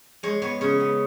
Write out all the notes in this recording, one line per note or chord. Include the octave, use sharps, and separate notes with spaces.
G#3 C#5
B3 C#5
C#3 C#5
B3